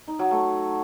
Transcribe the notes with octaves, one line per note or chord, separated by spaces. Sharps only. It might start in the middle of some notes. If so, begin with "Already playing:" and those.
D#4
F#3
A3